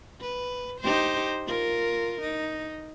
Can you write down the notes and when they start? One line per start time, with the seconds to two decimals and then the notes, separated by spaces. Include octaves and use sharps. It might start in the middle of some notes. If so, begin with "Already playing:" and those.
0.21 B4
0.81 D#4 G4 C5
1.47 F4 A#4
2.21 D#4